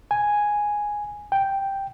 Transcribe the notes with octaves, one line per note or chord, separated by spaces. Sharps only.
G#5
G5